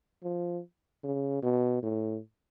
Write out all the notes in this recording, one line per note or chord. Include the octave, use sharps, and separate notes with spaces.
F3
C#3
B2
A2